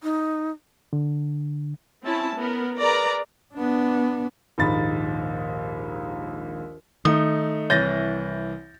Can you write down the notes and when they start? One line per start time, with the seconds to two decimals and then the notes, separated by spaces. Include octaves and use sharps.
0.03 D#4
0.93 D3
2.03 C4 C#4 E4 A5
2.35 B3 A#4
2.79 G#4 A#4 B4 D5 A#5
3.54 B3 D4
4.58 A#1 D#2 G#2 B5 A6
7.05 D#3 A3 D#4 D#6
7.70 C2 E3 C#5 G6 A6 A#6